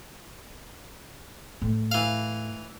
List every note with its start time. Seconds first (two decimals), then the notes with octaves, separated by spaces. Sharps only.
1.62 A2
1.91 E3 F5